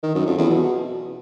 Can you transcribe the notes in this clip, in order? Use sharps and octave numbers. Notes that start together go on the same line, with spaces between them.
D#3
F#2
F2
E2
B2